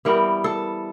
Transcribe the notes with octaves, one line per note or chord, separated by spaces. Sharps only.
E3 G3 B3 A#4
A4